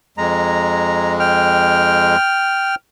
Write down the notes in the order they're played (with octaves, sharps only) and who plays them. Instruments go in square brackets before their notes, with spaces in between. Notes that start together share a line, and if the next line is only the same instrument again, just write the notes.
[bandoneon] F2 G#3 [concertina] A#5
[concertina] G5 F6